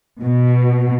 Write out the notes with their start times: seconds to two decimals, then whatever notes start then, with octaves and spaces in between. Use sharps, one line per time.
0.21 B2